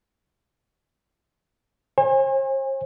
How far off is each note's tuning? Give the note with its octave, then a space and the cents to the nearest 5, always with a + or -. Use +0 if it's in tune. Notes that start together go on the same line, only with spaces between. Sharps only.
C5 +45 G#5 -30